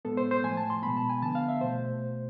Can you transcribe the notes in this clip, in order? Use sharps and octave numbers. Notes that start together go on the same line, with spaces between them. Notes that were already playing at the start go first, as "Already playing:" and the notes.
A2 G#3 B3 A4
C5
C5
A2 F3 A3 G#5
A5
C6
B2 G#3 B3 B5
A5
G#5
D3 F3 B3 A5
F5
E5
B2 A3 C5